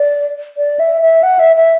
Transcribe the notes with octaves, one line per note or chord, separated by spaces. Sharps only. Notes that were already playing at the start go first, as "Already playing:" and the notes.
Already playing: D5
D5
E5
E5
F#5
E5
E5